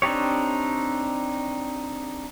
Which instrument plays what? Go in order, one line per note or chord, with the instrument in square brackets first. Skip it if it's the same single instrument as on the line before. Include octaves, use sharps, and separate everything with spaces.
[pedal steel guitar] C4 D4 D#4 G4 C#5